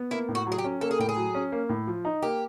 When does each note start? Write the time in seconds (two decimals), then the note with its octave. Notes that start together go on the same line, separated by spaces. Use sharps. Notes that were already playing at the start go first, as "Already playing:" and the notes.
Already playing: B3
0.11 A#3 E4
0.29 A2
0.35 F#4
0.47 F#3
0.52 G#4
0.58 G4
0.64 C#4
0.81 A#3 A4
0.91 G#4
0.99 A2 G4
1.09 G#4
1.16 F#3
1.35 C#4
1.52 A#3
1.69 A2
1.87 F3
2.05 D#4
2.22 A#3 G4